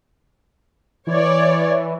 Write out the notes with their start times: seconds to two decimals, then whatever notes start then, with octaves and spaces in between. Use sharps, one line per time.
1.07 E3 C#5 D5